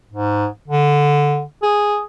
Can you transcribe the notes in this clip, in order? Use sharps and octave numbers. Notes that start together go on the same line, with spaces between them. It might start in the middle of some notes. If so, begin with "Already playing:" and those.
G#2
D3
G#4